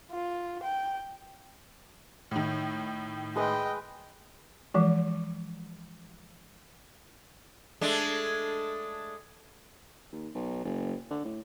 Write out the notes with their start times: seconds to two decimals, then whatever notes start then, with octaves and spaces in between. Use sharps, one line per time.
0.12 F4
0.63 G5
2.31 A2 D#3
3.36 G#3 B4 D#5 E5 G5
4.74 E3 F3 G#3
7.81 G#3 A3 D4
10.12 D#2
10.34 B1
10.64 F#1
11.10 D3
11.25 A2